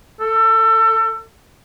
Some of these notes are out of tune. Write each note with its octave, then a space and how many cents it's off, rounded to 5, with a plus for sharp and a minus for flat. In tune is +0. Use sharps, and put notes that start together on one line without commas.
A4 +25